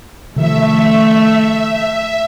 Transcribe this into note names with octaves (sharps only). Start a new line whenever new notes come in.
C3 D#3 F3 A3 E5